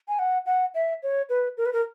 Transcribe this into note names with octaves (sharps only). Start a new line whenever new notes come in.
G#5
F#5
F#5
E5
C#5
B4
A#4
B4
A#4